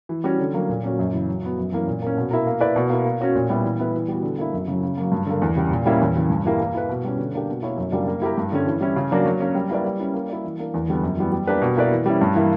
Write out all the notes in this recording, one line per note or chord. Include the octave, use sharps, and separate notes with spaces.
E3
G3 C#4 F#4
D3
F#3 A#3
A#2
A#3 C#4 F#4 C#5
F#2
C#3 E3
F#3
B3 F#4
F#2
E3 A#3 C#4
A#2
A#3 C#4
B2
A#3 E4 A#4
A#3
E4 B4 D5
B2
A#3 E4
A#3
C#4 F#4 C#5
A#2
G3 B3 E4
E3
B3 E4 B4
E3
G3 B3 F#4
D3
A#3 E4
F#2
C#3 F#3
C#3
F#3 A#3
G2
D3 A#3
E2
C#3 G3
A#2
G3 A#3 C#4 E4
E2
C#3 E3
G2
E3 G3 A#3 E4
A#3
E4 B4
B2
G3 C#4
D3
A#3 D4 G4
B2
A#3 E4 A#4 C#5
F#2
C#3 G3 A#3 D4
A#3
E4 G4 A#4
G2
D3 G3 C#4
E3
G3 C#4 E4
C#3
F#3 A#3 D4 F#4
F#3
A#3 C#4
G3
A#3 E4 B4 D5
G3
C#4 E4
A#3
E4 A#4 D5
E3
A#3 D4
E2
D3 G3 B3
F#2
E3 G3 B3
G3
A#3 D4 G4 B4
B2
A#3 E4 B4 D5
E3
G3 C#4 E4
G2
E3 A#3 E4